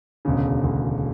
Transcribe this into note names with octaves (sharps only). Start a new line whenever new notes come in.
E1 D2 C#3
E1 D2 C#3